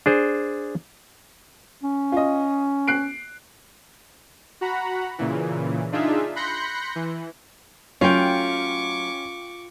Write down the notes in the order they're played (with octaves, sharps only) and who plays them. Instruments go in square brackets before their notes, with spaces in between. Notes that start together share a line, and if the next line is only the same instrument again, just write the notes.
[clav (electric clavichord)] D4 G#4 C5
[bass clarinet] C#4
[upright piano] F4 D#5
F#6 C7 D7
[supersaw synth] F#4 F#5 A#5 B5
A#2 C#3 E3
D4 D#4 F4 G#4 E5
B5 C6 F#6 G6 A#6 C#7
E3
[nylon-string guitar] F#3 A3 [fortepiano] C#4 [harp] F4 G5 [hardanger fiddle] C#6 D6